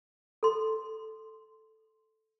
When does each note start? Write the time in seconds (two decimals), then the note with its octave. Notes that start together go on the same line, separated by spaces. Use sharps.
0.43 A4 C6